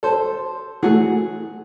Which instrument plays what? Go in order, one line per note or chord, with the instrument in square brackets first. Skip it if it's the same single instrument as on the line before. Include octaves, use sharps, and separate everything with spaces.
[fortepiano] A4 C5
[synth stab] E3 F#3 A3 [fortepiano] G#4 F#5